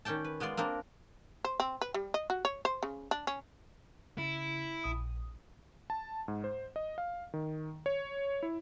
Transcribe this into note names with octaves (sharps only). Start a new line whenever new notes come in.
D#3 C#4 D5 G5 A5
B4
G#3 B3 F4 D5 C6
A#3 C4 D4 A#4
C5
C4
B4
G3
D#5
F#4
C#5
C5
C#3
D4
C#4
C#3 E4
A#1 D#6
A5
G#2
C5
D#5
F5
D#3
C#5
E4